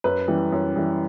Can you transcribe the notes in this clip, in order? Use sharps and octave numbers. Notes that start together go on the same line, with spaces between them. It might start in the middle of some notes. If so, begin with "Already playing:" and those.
F#2 B4
E3 G3
F#2
E3 G3